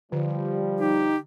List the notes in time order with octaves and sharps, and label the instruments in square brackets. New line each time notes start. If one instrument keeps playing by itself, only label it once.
[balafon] D3 [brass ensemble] F3 G3
[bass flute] D#4 [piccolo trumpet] G4